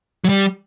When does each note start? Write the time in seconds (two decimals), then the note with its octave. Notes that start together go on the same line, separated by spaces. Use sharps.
0.24 F#3
0.29 G3